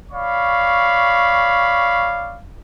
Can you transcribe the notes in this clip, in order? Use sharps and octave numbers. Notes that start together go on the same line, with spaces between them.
C#5 D5 F5 B5 C#6